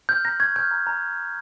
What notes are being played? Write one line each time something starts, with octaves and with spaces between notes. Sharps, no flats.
F6 G6
A#5 A#6
C#6 G#6
F6 G6
A#5
A#5